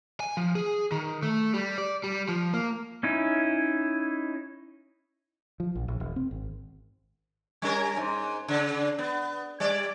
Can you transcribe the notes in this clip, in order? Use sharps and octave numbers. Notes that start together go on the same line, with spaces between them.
G#5
F3
G#4
D#3
A3
G3
D5
G3
F3
A#3
C#4 D#4 E4
F3
A#1
A#1
E1
C4
G#1
G3 C#4 A#4
G#2
C#3
B3
G3 D5